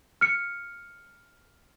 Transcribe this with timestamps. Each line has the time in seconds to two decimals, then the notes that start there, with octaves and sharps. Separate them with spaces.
0.21 F6 C#7